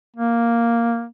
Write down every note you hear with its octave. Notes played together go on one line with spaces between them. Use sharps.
A#3